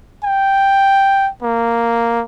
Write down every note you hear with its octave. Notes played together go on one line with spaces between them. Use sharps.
G5
A#3